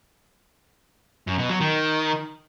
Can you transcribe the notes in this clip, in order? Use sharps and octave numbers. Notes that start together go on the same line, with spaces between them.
F#2
B2
F#3
D#3